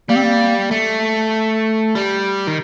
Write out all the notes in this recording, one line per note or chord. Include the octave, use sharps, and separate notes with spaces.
G3 A#3
C4
A#3
A3
G3
D#3